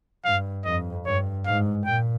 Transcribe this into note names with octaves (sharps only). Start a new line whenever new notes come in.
G2 F5
F2 D#5
G2 C#5
G#2 F5
A#2 G5